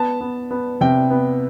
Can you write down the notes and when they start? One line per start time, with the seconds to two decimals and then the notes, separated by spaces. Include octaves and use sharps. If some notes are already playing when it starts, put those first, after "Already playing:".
Already playing: B3 A5
0.21 B3
0.51 B3
0.81 C3 G5
1.10 B3